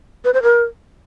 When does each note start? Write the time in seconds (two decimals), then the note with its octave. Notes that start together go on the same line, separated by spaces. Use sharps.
0.25 B4
0.34 C5
0.43 A#4